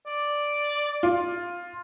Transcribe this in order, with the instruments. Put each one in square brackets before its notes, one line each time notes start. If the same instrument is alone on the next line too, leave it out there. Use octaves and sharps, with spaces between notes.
[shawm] D5
[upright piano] F4